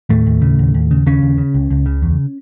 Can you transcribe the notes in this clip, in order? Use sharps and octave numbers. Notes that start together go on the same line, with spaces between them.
D#2 A2 A3
D#2
C#3
D#2
D#2
C#3
D#2 C#3 C#4
D#2
C#3
C#2
C#2
C#3
E2